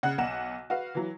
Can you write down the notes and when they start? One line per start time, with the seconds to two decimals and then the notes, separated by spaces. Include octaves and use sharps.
0.03 C#3 F#5 F#6
0.18 B1 F#5 E7
0.70 F#4 B4 F5
0.95 E3 F#3